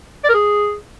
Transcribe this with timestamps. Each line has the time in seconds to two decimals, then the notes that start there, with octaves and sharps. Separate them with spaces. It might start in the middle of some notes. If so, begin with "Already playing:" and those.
0.24 D5
0.29 A#4
0.34 G#4